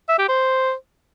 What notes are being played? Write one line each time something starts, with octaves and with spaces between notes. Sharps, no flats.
E5
G4
C5